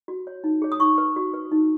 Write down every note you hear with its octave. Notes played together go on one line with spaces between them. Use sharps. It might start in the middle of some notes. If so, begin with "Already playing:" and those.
F#4
C#5
D#4
G#4 C#5
D#6
D#4 C#6
B4
F#4
B4
D#4